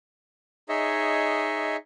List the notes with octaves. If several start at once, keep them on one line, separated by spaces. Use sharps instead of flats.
D#4 G#4 C#5 D#5 E5